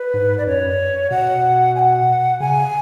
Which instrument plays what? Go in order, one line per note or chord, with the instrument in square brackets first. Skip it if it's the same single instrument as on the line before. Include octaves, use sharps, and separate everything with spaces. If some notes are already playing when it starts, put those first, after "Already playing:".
Already playing: [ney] B4
[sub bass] G#2
[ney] D5
[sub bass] F#2 [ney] C#5
[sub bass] B2 [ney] F#5
[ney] G#5
F#5
[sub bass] C#3 [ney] G#5